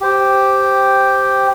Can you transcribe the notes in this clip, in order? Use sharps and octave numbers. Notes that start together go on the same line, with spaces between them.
G4 C5 G5